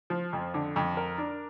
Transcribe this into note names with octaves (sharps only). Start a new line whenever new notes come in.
F3
F2
D3
F2
A#4
D4